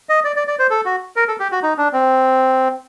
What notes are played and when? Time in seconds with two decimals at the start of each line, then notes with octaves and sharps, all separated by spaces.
0.09 D#5
0.24 D5
0.36 D5
0.48 D5
0.59 C5
0.70 A4
0.85 F#4
1.16 A#4
1.28 A4
1.40 G4
1.52 F#4
1.63 D#4
1.78 D4
1.93 C4